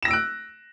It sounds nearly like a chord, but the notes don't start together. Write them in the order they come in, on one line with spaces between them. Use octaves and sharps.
E7 A#6 E6 D7 F#6